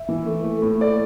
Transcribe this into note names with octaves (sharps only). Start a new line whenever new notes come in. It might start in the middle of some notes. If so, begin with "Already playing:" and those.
Already playing: E5
E3
A3
A3
A2
A3 D5